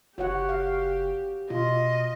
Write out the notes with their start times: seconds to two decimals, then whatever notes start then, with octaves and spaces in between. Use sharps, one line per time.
0.18 F#1 F#4 G4 C#5 F#5
0.49 F5
1.50 B2 F4 D#5